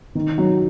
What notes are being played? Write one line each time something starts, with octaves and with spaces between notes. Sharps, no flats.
D#3
F#3